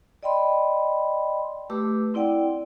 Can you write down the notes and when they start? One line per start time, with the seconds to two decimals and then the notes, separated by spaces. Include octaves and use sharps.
0.23 D5 D#5 G5 B5 C6
1.70 A3 G4 B4 D6 E6
2.14 C4 E4 D5 F#5 G5